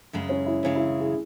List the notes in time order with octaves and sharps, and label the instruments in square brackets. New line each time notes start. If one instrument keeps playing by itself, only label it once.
[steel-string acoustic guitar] F#2 C#3 G#3
[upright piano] C#4
E4
[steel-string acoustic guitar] F#2 C#3 G#3 [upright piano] C#4
[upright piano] E4
G#4